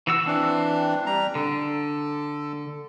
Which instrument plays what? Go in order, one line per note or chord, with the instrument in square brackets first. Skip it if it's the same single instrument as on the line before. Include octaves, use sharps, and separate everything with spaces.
[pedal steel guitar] E3 F#4 E6
[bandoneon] E3 D4 [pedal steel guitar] C4
[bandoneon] G3 A#5
[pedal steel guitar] D3 [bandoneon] A4